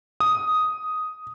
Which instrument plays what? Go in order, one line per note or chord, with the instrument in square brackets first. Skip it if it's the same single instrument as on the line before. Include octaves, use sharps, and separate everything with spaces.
[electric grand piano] D#6